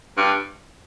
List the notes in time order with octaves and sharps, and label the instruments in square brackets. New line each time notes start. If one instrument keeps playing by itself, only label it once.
[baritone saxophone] G2